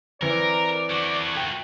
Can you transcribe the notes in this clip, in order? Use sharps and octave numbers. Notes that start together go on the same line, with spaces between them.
E3 C4 A#4 D5
A3 F#4
G5 G#6